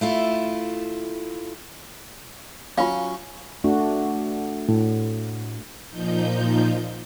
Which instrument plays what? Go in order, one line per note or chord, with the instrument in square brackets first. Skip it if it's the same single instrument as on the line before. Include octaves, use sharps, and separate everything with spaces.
[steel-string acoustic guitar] A3 E4 F4
[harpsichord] F#3 C#4 [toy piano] F4 F5
[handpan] A3 D4 F#4
[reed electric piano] A2
[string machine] A#2 F3 D#4 G6